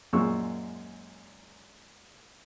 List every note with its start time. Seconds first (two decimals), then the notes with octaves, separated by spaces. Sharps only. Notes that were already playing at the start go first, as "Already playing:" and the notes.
0.13 F#2 A#2 G#3 F4 C#6 E6